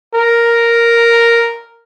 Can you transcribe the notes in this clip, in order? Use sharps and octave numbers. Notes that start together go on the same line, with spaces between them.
A#4